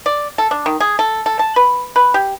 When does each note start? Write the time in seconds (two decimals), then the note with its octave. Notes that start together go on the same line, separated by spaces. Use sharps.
0.06 D5
0.38 A4
0.51 D4
0.66 D#3
0.80 G#4
0.99 A4
1.26 A4
1.39 A5
1.56 B4
1.96 B4
2.14 G4